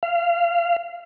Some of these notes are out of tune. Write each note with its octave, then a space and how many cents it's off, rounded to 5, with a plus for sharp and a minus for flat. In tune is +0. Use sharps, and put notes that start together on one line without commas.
F5 -25